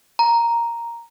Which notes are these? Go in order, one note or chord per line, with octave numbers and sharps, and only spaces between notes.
A#5